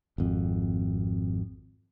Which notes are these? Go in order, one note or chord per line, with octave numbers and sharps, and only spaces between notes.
G#1 F2